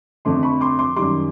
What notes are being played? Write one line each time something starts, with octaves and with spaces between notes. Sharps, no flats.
F2 D3 F3 A3 C6 D6
B5 C#6
C6 D6
C6 D6
F#2 D#3 G3 C6 D6